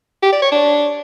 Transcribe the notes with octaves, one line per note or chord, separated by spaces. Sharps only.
G4
D5
C#5
D4